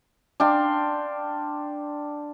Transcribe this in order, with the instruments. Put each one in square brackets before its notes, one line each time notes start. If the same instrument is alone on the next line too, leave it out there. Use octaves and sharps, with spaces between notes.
[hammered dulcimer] D4 F5 G5 C6